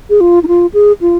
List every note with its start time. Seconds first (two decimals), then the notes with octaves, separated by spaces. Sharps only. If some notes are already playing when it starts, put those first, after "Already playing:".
0.10 G#4
0.21 F4
0.43 D#4
0.48 F4
0.74 G#4
1.01 F4